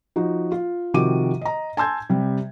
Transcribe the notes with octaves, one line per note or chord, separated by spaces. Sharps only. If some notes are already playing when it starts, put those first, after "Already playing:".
F3 D#4 F#4
F4
C3 D#3 F3 F#4 D6 D#7
D#5 A#5
G#5 A5 C6 E6 G6 G#6
C3 G3